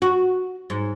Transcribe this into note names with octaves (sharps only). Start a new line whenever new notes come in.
F#4
G#2